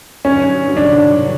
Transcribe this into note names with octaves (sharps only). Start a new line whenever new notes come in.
G2 D3 F#3 C#4
D4